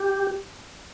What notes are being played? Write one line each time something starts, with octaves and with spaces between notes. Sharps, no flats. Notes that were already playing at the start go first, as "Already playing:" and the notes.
Already playing: G4